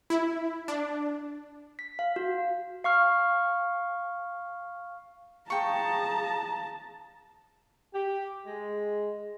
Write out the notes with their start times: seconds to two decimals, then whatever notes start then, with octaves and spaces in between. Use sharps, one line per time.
0.10 E4
0.68 D4
1.79 B6
1.99 F5
2.16 F#4
2.84 F5 C#6 F6
5.50 G#4 F5 G5 A5 A#5 C#6
7.94 G4
8.46 G#3